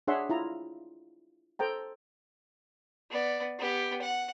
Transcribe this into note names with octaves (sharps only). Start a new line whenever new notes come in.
D4 G#4 C#5 E5 F#5 C6
E4 F4 A#5
A4 C5 G5 A#5
B3 D5
B3 G4
F#5